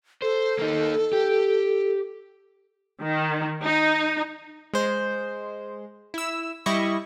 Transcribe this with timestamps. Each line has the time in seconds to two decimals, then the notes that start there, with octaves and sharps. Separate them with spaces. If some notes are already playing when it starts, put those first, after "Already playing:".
0.22 A4 C5
0.59 A#3 D#4
1.13 G4
3.03 D#3
3.64 D#4
4.73 G#3 C5
6.14 E4 E6
6.66 G3 E4 D#5 C#6